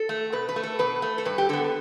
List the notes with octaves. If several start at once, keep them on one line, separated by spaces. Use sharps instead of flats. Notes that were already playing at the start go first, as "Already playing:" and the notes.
Already playing: A4
A3
B2 B4
B4
A3
A4
B2 B4
A3
A4
G2 B4
G4
D3 B3 A4